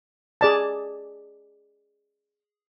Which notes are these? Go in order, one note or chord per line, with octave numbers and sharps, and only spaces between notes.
G#4 D5 A5